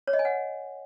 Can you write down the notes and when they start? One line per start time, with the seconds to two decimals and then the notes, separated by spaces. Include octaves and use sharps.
0.07 C#5
0.13 D#5
0.19 G#5
0.25 F#5